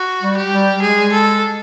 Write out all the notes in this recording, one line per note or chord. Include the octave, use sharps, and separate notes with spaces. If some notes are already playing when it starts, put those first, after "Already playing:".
Already playing: F#4
G3
G4
G3
G#3 G#4
A4